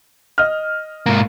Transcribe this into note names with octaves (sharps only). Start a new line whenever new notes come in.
D#5 F6
G#2 A#3